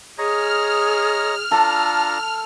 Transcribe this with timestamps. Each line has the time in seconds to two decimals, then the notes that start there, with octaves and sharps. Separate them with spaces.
0.18 G#4 C#5 D#5 A#5 F6
1.52 D4 F4 A4 A5 A#5